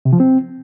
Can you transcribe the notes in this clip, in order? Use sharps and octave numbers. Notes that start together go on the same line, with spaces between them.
C3
F3
C4